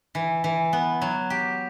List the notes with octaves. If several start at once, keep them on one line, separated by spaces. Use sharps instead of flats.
E3
E3
B3
F#3
G4